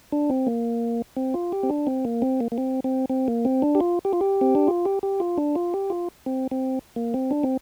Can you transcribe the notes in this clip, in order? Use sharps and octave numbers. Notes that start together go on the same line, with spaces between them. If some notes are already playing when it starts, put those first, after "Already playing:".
D4
C4
A#3
C4
F4
G4
C4
D4
C4
A#3
C4
A#3
A#3
C4
C4
C4
A#3
C4
D4
G4
F4
G4
F4
G4
C4
D4
F4
G4
G4
F4
D4
F4
G4
F4
C4
C4
A#3
C4
D4
C4